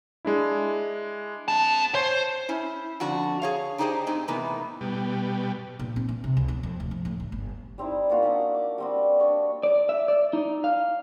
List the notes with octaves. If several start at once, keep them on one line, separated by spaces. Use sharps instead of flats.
G#3 D4 E4
C4 A5
C5 C#5
C#4 E4
F2 D3 D4 F#4 A5
G#4 C#5 F5
D4 D#4 G4 G#4 C5 D#5
G#2 C4 D#4
A2 C3 E3 A#3 B3
B2 G3
A#2
C4
E3
C3
C#2
B2
F2
D1
F3
A2
D2
G1
G3 C4 D#4 E4
A#3 F4 F#4
C#4 D4 F#5 D#6
D6
G3 C4 F#4
D4 C#5 D#5
D5
E5
D5
D#4
F5